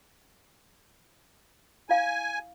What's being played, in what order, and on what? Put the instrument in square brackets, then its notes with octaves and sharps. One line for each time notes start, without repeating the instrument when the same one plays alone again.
[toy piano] E4 F5 [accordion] G#5